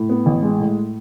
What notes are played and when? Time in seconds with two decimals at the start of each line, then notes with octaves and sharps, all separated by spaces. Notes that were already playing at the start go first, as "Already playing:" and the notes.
Already playing: A2
0.09 B3
0.26 A1
0.43 G#3
0.60 A2